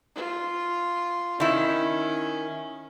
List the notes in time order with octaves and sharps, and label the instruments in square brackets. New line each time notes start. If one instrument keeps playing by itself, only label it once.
[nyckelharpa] F4
[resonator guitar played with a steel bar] D#3 E4 [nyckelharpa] C#4